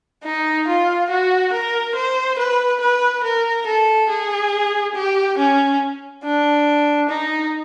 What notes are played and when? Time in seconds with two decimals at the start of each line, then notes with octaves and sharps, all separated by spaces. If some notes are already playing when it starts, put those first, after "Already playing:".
0.24 D#4
0.68 F4
1.10 F#4
1.53 A#4
1.95 C5
2.39 B4
2.81 B4
3.24 A#4
3.67 A4
4.09 G#4
4.96 G4
5.38 C#4
6.24 D4
7.09 D#4